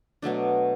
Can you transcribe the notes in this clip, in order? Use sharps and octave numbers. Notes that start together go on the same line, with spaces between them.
B2 F#3 A3 D4